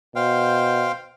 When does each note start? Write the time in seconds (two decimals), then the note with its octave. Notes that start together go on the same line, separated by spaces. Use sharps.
0.16 B2 C5 F5 G5